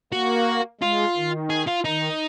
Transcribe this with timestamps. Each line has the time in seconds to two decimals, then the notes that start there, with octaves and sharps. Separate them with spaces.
0.12 A#3 F#4
0.81 G#3 F4
1.16 D#3
1.50 G#4
1.67 F4
1.85 D#3 D#4